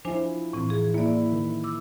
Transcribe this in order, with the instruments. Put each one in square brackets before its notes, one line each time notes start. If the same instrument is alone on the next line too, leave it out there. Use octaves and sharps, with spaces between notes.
[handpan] F3 E4 [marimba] D4 C5 G#5
[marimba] A2 E3 C4
E3 G#4
[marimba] A#3 D5 [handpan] E4
[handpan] D#3
[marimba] D6 E6